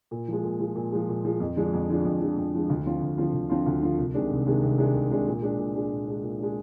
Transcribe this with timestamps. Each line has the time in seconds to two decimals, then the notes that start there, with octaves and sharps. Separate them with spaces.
0.11 A#2
0.28 F3 G#3
0.44 A#2
0.60 F3 G#3
0.76 A#2
0.92 F3 G#3
1.09 A#2
1.25 F3 G#3
1.40 F2
1.56 D3 F3 G#3 D4
1.73 F2
1.88 D3 F3 G#3 D4
2.05 F2
2.21 D3 F3 G#3 D4
2.38 F2
2.53 D3 F3 G#3 D4
2.70 D2
2.86 D3 F3 C4 F4
3.02 D2
3.18 D3 F3 C4 F4
3.34 D2
3.50 D3 F3 C4 F4
3.66 D2
3.82 D3 F3 C4 F4
3.97 C2
4.14 C3 D#3 G#3 D4
4.30 C2
4.46 C3 D#3 G#3 D4
4.63 C2
4.78 C3 D#3 G#3 D4
4.94 C2
5.11 C3 D#3 G#3 D4
5.27 A#2
5.42 G#3 D4
5.58 A#2
5.76 G#3 D4
5.91 A#2
6.07 G#3 D4
6.23 A#2
6.39 G#3 D4